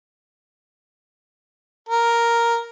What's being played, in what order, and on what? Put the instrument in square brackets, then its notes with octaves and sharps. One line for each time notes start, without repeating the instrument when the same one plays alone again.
[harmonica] A#4